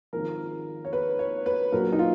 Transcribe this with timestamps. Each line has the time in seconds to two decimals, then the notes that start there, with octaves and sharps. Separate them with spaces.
0.13 G#1 G#2 F3 A#4
0.85 C#5
0.93 B4
1.19 C#5
1.46 B4
1.72 A#1 A#2 F#3 A#4
1.92 D#4
1.99 F4